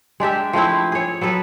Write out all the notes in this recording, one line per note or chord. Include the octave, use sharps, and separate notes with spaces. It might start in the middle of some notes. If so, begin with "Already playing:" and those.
G#3 D4 G4 E5
F3 A3 C4 E4
G#4 C#5
F#3 B3 A4 B4